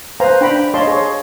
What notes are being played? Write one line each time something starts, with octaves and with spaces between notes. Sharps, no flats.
B4 C5 F5 G#5 A#5
D4 G5 A#5 B5
C#5 D#5 F5 G5 A5 C6
G#4 C#5